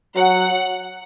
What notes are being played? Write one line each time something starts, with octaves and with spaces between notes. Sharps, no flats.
F#3 F#5